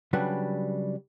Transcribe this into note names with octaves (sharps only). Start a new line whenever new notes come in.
C#3 F#3 G3 D4 B4